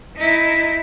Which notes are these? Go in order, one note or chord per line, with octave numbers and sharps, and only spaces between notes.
D#4 E4